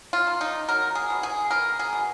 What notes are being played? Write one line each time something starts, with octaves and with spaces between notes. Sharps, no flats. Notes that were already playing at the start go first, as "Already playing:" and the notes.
F4
A#3
D#4
F#3 A#4
G#4
B2
G#4
B3 A#4
G#4
B2